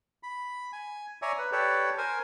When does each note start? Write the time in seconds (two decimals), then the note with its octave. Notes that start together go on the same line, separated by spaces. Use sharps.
0.23 B5
0.73 G#5
1.22 C#5 D5 E5 G#5 A#5
1.38 B4
1.52 G4 A4 B4 C#5 D5
1.98 A#4 C5 G#5